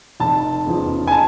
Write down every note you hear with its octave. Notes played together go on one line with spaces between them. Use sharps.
F1 A5
E2 C#3 F3
G#5
A5